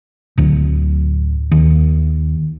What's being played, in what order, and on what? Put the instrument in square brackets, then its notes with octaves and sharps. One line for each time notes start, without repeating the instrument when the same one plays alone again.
[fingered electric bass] D1 D2
D#2